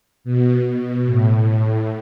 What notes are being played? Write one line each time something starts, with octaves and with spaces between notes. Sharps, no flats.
B2
B2
A2